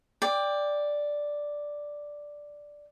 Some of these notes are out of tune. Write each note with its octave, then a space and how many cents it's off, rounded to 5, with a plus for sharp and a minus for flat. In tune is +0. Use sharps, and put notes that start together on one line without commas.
D5 +0 G5 +20